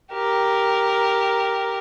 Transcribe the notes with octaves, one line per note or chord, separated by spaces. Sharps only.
G4 A#4